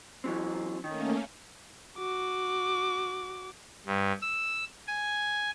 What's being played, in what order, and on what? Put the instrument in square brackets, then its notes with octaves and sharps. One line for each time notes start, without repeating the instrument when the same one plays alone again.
[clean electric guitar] E3 F#3 C4
[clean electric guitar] D#3 [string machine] A3 A#3 C#4
[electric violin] F#4 D6
[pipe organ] G2
E6
G#5